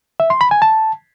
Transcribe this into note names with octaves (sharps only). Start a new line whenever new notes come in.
E5
C6
B5
G#5
A5